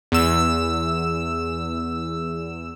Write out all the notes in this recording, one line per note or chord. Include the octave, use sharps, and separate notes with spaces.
E2 E6